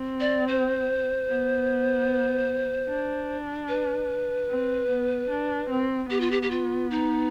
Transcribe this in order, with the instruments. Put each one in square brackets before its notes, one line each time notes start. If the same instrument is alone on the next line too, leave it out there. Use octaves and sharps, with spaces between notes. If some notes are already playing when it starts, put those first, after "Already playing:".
Already playing: [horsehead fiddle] C4
[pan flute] D5
C5
[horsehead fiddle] B3
D4
[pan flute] B4
[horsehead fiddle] C4
B3
D4
C4
[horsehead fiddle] B3 [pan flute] G4
[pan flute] F4
G4
G4
F4
D#4